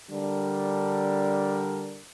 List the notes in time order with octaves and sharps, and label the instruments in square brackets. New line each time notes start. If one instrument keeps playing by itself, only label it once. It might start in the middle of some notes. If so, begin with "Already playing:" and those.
[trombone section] D3 G3 D4 A#4